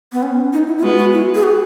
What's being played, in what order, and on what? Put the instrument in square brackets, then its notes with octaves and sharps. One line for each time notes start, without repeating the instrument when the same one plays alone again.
[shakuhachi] B3
C#4
D#4
E4
E4
[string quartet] G#3 B3 [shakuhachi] F#4
[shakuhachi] F#4
E4
G#4
F#4